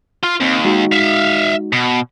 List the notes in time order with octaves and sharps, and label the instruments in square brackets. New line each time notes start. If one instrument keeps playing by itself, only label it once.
[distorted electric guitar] F4
[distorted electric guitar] D#2 [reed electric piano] C4
[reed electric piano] G#3 D#4 F#4
[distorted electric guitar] E5 F5
B2